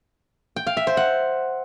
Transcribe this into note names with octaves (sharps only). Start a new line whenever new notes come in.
G5
F5
E5
C5
F#5